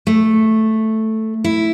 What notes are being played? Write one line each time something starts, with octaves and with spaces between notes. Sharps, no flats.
A3
E4